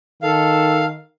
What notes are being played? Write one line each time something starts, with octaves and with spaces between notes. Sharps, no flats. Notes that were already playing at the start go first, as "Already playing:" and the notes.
D#3 A4 F5